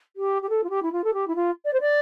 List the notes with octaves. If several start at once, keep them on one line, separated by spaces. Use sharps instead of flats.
G4
G4
A4
F4
G4
E4
F4
A4
G4
E4
F4
D5
C5
D5